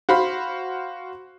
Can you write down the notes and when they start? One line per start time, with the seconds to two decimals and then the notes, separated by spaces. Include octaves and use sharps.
0.09 F#4 C5 F5 B5